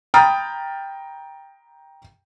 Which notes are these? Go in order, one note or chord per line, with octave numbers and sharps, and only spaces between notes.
G5 A#5 B5 D#6 F6 A6